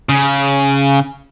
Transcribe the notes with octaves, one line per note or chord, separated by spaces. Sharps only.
C#3